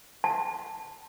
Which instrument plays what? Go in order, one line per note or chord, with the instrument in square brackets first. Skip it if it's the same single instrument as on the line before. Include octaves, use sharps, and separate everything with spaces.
[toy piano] A5